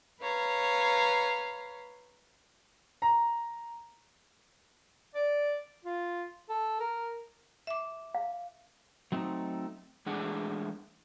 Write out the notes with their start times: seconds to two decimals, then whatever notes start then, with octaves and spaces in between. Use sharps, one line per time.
0.20 B4 C#5 F5 A#5
3.02 A#5
5.15 D5
5.85 F4
6.49 A4
6.80 A#4
7.67 E5 D6
8.15 F5
9.12 F#3 A3 C4 D#4
10.06 E3 G#3 A3 D4 G#4 F#5